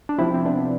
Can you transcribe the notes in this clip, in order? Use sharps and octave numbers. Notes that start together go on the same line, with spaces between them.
D4
C3 F3 C4 E4
C4
B3 D4